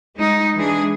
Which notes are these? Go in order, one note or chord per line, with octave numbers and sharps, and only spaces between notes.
G#3 D#4
E3 G#3 D4 G#4